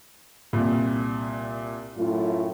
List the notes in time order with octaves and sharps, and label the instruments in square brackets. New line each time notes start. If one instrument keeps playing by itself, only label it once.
[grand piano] C2 A#2
[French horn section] F#2 A2 F4